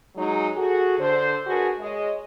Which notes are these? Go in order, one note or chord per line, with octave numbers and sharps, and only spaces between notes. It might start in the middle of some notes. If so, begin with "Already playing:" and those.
F#3 G#3 D#4
F#4 G#4 A4
D3 C5
D4 F#4 G#4 A#4 B4
G#3 C#5 D#5